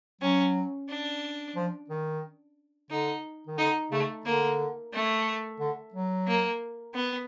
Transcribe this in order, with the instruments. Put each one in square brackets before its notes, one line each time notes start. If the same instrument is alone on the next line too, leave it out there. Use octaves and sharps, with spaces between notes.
[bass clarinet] F#3 [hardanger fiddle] C#4
[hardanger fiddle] D4
[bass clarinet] F3
D#3
[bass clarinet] D3 [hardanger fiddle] D#4
[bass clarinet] D#3
[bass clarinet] D3 [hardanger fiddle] D#4
[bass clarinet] C#3 [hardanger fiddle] A3
[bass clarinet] D3 [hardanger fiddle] A#3
[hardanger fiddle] A3
[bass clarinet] D3
F#3
[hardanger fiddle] A#3
B3